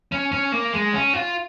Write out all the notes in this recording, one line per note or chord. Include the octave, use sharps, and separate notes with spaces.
C#4
C#4
A#3
G#3
C#4
F4